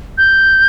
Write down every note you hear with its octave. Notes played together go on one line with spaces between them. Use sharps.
G6